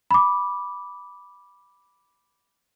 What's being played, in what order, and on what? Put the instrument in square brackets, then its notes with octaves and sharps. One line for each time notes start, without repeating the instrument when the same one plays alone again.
[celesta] B5 D6